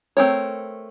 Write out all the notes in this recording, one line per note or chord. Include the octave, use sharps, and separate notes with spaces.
A3 C4 A#4 C#5